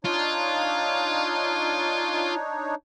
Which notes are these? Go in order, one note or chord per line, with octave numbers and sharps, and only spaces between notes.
D4 D#4 F4 C#5